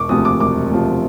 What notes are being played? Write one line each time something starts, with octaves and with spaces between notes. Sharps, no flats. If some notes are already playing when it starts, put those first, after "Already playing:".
Already playing: E1 C#6 D6
D2 C3 F3 D#6
D6
E1 D6
D2 C3 F3